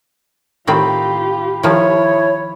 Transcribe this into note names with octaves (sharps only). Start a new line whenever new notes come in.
A2 D#3 C4 F4 G4 B5
D#3 F3 E4 C#5